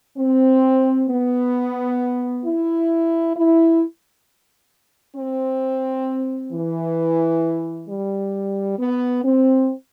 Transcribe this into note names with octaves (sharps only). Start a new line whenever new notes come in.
C4
B3
E4
E4
C4
E3
G3
B3
C4